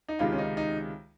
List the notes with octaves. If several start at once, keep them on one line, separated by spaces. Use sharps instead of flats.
D#4
C#2 C3 D#3 G#3 F4
C#4
D#4
D#4